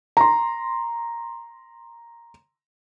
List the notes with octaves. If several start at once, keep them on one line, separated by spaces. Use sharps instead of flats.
A#5 C6